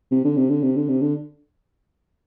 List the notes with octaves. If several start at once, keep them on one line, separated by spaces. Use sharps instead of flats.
C3
D3
C3
D3
C3
D3
C3
D3